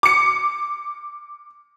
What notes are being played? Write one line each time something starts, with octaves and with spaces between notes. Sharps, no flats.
D6 C#7